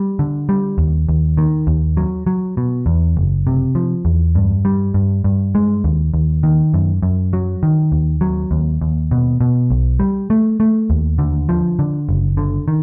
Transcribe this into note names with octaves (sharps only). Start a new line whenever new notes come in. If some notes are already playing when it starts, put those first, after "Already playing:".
Already playing: G3
D3
G3
D#2
D#2
D#3
D#2
F#3
F#3
B2
E2
F#1
C3
F3
E2
G2
G3
G2
G2
G#3
D#2
D#2
D#3
F#2
F#2
F#3
D#3
D#2
F#3
D#2
D#2
B2
B2
B1
G3
A3
A3
D#2
D3
F3
D3
F#1
D3
D#3